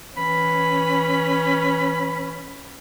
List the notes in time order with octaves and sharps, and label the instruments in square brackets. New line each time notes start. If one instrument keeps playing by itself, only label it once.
[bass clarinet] E3 [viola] C#4 [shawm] B5